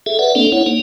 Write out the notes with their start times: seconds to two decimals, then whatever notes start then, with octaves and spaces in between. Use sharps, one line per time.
0.06 G#4 A4 E5
0.19 B4 D5 E5 F#5
0.35 A#3 C4 D4 A4
0.52 E4 C#5 F#5
0.66 A#3 D#4